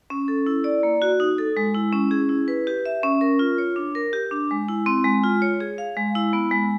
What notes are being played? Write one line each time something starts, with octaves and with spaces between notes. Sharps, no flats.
C#4
A4
E4
D5
A#3
F#4
D#4
A4
G#3
E4
C#4
G#4
E4
B4
G4
E5
C#4
A#4
F4
C#5
D4
A#4
G4
D4
G#3
E4
C4
G#3
F4
C#5
G#4
F5
G#3
E4
B3
G#3